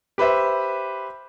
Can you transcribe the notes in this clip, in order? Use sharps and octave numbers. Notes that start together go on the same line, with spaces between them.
G4 B4 C5 E5